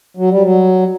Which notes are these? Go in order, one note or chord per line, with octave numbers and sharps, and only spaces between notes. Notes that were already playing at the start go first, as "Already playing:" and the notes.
F#3
G3
F#3